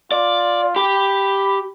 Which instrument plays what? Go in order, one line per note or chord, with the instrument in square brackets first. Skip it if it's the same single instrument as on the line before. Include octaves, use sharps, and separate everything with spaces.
[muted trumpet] F4 [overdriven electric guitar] D5
[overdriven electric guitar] G4 [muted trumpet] B5